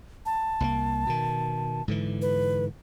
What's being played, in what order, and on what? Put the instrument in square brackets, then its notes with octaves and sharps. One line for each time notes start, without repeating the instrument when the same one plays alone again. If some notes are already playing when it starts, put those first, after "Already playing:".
[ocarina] A5
[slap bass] C2 G#3 A#3
B2 D#3
G#2 D3 E3
[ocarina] B4